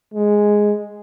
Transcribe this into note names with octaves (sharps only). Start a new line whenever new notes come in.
G#3